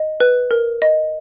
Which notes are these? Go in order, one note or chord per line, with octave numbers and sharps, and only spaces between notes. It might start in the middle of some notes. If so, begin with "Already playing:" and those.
Already playing: D#5
B4
A#4
D#5